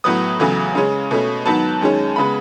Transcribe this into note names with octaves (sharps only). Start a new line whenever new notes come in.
A2 F#3 B3 D#6
E2 C#3 F#3 A3
C#3 G#3 C#4
B2 A3 C#4
G#2 D#3 F#3 B3 A5
F#2 D#3 G#3 C#4
C#3 G#3 B3 B5